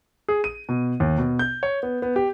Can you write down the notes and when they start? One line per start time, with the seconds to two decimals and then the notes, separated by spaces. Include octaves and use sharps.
0.28 G#4
0.44 D#7
0.69 B2
1.00 D#2
1.18 B2
1.39 G6
1.63 C#5
1.83 B3
2.02 B3
2.16 G4